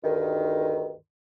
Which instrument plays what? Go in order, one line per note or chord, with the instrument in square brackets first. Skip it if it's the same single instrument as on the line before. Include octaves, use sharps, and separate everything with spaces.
[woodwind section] D2 G2 D#3